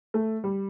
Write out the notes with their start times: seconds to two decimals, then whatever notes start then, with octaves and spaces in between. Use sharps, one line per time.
0.14 A3
0.44 G3